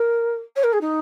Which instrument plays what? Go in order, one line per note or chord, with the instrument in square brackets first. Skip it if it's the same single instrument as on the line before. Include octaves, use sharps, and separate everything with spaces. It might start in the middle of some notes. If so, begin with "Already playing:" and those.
Already playing: [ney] A#4
C#5
A#4
G#4
D#4